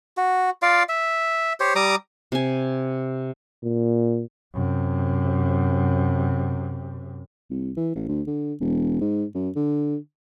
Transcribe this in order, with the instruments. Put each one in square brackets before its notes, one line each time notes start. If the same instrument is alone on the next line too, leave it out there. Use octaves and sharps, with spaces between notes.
[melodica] F#4
F4 D5 F5
E5
G4 C5 C#5
G3 A#5 D6 D#6
[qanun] C3 G#5
[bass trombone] A#2
[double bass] F#2 C3
[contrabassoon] C2
E3
A1
D2
D3
E1
G#2
F#2
D3